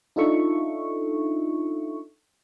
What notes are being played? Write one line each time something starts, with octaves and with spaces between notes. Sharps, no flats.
D4 D#4 F4 A4 E5 C#6